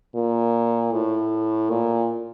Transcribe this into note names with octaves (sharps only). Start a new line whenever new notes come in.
A#2
A2
A#2